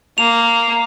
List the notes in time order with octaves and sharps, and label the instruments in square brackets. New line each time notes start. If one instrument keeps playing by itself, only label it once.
[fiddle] A#3 [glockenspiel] F7